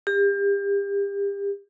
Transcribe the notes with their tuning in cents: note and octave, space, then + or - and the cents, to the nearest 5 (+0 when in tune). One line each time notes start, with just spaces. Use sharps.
G4 +35